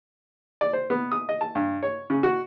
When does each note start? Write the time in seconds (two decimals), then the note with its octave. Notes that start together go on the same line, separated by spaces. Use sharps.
0.61 D5
0.73 C5
0.90 B3
1.12 D#6
1.29 D#5
1.41 A5
1.55 G2
1.83 C#5
2.10 C#3
2.23 F#4